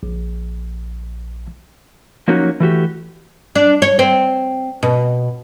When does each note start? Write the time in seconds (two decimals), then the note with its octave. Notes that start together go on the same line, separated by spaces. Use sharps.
0.03 A#1
2.28 F3 F#3 A#3 C#4 D#4 F#4
2.60 E3 A3 F#4 G4
3.55 D4
3.82 C#5
3.99 C4
4.83 B2